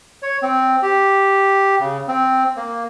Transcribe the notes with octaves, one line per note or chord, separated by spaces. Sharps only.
C#5
C4
G4
C#3
C4
A#3